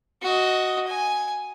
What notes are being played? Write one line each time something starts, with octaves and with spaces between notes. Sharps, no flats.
F#4 D#5
G#5